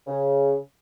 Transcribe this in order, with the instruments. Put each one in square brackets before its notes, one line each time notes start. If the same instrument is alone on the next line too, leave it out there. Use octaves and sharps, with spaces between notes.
[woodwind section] C#3